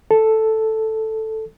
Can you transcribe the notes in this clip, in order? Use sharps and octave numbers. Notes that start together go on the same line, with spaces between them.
A4